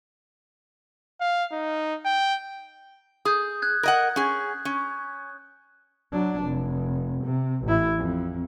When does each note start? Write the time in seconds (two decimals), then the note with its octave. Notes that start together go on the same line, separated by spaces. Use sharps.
1.20 F5
1.52 D#4
2.05 G5
3.25 G#4 D#6 G6
3.62 F#6 G#6
3.83 A#4 D#5 F#5
4.16 C#4 G#4
4.65 C#4
6.12 F#3 D4
6.43 F1
7.25 C3
7.64 A1 E4
7.97 F2